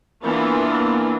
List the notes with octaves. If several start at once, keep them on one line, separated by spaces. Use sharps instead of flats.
E3 A#3 B3 D4 F4